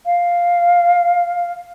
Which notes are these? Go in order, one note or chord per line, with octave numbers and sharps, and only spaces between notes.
F5